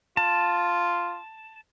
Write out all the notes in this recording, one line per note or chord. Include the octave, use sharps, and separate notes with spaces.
F4 A5